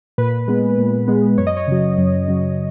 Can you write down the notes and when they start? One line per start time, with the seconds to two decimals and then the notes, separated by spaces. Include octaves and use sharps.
0.18 A#2 B4
0.48 G#3 B3
0.78 A#2
1.08 G#3 B3
1.38 F#2 C#5
1.47 D#5
1.57 C#5
1.67 C#3 F#3
1.98 F#2
2.28 C#3 F#3